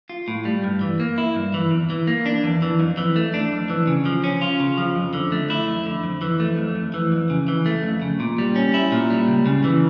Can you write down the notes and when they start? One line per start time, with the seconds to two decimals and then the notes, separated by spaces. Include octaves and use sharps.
0.10 F4
0.28 A2
0.45 G3
0.64 G2
0.81 E3
1.00 A#3
1.18 E4
1.36 G2
1.54 E3
1.71 E2
1.90 E3
2.07 A#3
2.26 D4
2.44 E2
2.62 E3
2.80 F2
2.98 E3
3.16 A3
3.34 D4
3.52 F2
3.70 E3
3.87 C#3
4.06 F3
4.24 C#4
4.42 F4
4.60 C#3
4.77 F3
4.96 F2
5.13 D3
5.32 A3
5.50 E4
5.68 F2
5.86 D3
6.04 F2
6.22 E3
6.40 A3
6.58 F2
6.76 F2
6.94 E3
7.12 F2
7.30 C#3
7.48 E3
7.66 A3
7.83 F2
8.02 C#3
8.20 A#2
8.38 G3
8.56 C#4
8.74 E4
8.92 A#2
9.10 G3
9.28 C#2
9.46 C#3
9.64 E3